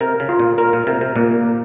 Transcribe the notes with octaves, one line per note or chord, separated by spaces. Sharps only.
C3 A#4
C#3
F4
A#2
A#4
A#2
C3 A#4
C3
A#2 A#3
A#3